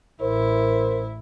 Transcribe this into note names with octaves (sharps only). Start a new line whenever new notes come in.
A1 E4 A#4 C5